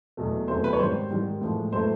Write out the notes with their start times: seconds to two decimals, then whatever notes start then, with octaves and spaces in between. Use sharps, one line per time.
0.17 E2 B2 F#3 A3
0.48 E2 C3 D#3 F#3 A3 C5
0.64 B4
0.73 C#5
0.79 G#2 D#3 G3 C5
1.11 G#2 D#3 G3
1.41 A2 F3 G#3
1.73 A2 F#3 A3 C5